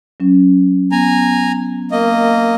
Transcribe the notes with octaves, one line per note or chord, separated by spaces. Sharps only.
F#3 C#4
B3 G#5 A#5
A#3 A#4 D#5